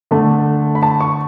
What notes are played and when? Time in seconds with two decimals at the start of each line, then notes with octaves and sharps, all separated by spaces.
0.11 D3 A3 A5
0.75 B5
0.83 A5
1.01 C#6